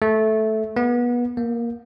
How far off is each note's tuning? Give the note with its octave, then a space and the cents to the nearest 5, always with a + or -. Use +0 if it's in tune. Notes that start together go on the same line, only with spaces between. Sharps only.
A3 -10
B3 -30
A#3 +10